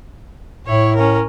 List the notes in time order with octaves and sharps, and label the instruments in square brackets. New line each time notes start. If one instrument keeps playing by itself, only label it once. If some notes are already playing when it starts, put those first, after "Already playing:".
[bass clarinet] A2 [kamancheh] E4 C#5
[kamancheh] C#4 A#4